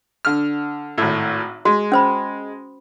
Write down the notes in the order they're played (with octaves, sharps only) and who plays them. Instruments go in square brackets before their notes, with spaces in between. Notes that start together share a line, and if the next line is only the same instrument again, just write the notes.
[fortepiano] D3 F6
G#1 A2
[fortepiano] G#3 [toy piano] F#4
[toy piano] C#4 C5 B5